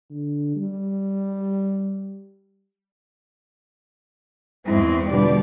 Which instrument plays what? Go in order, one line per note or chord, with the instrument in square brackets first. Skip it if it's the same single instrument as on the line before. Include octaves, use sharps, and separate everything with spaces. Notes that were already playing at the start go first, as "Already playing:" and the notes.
[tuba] D3
G3
[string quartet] E2 G#2 [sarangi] C4 [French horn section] D#4 E4
[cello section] B2 D3 G3 [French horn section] F4 G4 B4 [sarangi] D5